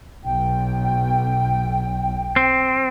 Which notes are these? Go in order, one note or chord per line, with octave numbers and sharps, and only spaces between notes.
B1 G5
C4